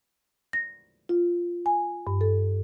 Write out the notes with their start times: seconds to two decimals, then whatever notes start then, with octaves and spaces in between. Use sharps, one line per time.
0.53 A#6
1.09 F4
1.66 G#5
2.07 G2
2.21 A4